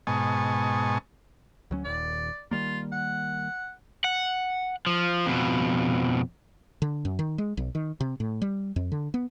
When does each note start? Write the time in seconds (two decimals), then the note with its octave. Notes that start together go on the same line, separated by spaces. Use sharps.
0.07 G#2 B2 G#5 A5 C#6 D#6
1.71 D2 F#3 C#4
1.85 D#1 G#1 D#2 D5
2.51 D#3 G3 A#3 F4
2.92 F#5
4.04 F#5
4.87 F3
5.26 F2 B2
6.82 D3
7.05 F#2
7.19 D#3
7.38 G#3
7.57 B1
7.75 D#3
8.01 C3
8.20 A2
8.42 G3
8.76 F2
8.92 D3
9.14 B3